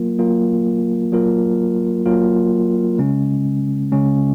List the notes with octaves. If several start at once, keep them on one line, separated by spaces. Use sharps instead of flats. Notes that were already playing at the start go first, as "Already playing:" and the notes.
Already playing: F#3 A#3 F4 A#4
F#3 A#3 F4 A#4
F#3 A#3 F4 A#4
F#3 A#3 F4 A#4
C#3 G#3 C#4
C#3 G#3 C#4